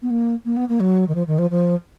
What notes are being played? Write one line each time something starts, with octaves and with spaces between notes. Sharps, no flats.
B3
A#3
A#3
B3
A#3
F#3
D#3
F3
D#3
F3
F3